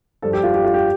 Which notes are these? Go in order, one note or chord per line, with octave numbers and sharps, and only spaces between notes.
G2 F3 A4
G4
F4
G4
F4
G4